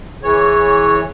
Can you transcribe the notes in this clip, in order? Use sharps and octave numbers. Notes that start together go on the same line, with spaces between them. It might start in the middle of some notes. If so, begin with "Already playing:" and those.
E3 G#4 C#5